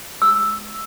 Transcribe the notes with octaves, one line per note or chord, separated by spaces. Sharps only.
E6